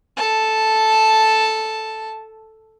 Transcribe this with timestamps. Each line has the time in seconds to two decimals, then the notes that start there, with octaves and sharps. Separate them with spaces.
0.17 A4 A5